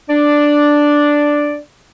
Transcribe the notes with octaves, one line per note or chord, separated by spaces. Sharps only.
D4 D5